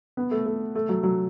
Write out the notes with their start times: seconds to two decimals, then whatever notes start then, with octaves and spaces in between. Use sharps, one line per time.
0.17 B3
0.31 A3
0.46 A3
0.75 A3
0.89 F#3
1.03 F#3